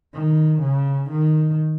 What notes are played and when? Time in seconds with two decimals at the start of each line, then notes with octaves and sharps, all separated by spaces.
0.14 D#3
0.62 C#3
1.10 D#3